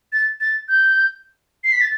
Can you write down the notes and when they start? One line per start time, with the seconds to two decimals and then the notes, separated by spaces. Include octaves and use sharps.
0.13 A6
0.41 A6
0.68 G6
1.64 C7
1.72 B6
1.81 A6